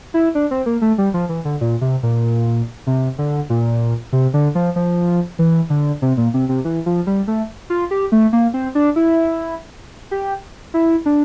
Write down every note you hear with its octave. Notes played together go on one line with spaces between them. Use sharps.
E4
D4
C4
A#3
A3
G3
F3
E3
D3
A#2
C3
A#2
C3
D3
A#2
C3
D3
F3
F3
E3
D3
C3
A#2
C3
C3
E3
F3
G3
A3
F4
G4
A3
A#3
C4
D4
E4
G4
E4
D4